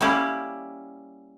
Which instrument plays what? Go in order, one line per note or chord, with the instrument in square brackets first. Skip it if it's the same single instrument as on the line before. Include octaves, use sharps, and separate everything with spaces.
[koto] G3 A#3 C#4 E4 G4